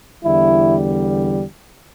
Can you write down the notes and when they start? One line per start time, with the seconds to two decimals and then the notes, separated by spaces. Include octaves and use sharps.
0.24 E2 D3 G3 E4